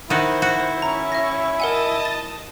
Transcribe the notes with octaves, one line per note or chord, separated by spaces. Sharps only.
D#3 E4 F#4 C5 D#7
F#4
C#4 A#5 C#6
E5 A#6
A#4 D#5 F#5 G#5 A5
A6